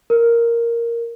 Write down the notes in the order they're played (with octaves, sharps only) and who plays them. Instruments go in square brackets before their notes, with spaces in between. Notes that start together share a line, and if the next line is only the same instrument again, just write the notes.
[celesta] A#4